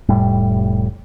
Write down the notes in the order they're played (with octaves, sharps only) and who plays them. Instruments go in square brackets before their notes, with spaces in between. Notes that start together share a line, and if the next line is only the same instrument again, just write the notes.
[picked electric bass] F1 A2 G3